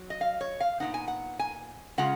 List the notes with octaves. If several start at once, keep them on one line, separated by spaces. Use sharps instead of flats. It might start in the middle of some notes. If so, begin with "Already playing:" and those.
Already playing: F#3
D#5
F5
C#5
F5
A#2 G#3 B3 D#4 F#5
G#5
F#5
G#5
C#3 G#3 C#4 F4 F#5